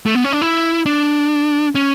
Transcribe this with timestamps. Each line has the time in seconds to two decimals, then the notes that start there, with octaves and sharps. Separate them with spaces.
0.06 A3
0.15 B3
0.24 C#4
0.32 D4
0.41 E4
0.86 D4
1.75 C#4